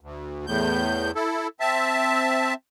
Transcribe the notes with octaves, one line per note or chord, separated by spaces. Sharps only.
D2
E2 A2 G6
E4 A4
C4 E5 A5